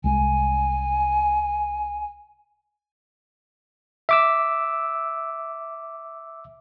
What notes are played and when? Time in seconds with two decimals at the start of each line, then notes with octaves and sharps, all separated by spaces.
0.04 C2 G#3 G#5
4.09 E5 D6 E6